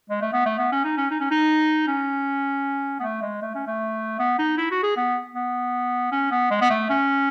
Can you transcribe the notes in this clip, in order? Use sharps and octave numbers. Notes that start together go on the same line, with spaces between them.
G#3
A3
B3
A3
B3
C#4
D#4
C#4
D#4
C#4
D#4
C#4
B3
A3
G#3
A3
C#4
A3
B3
D#4
E4
F#4
G#4
B3
B3
C#4
B3
G#3
B3
A3
C#4